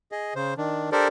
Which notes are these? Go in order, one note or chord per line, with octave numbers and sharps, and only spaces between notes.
G#4 D#5
C#3 C5
D#3 D4
D4 G4 A4 A#4 C5 D5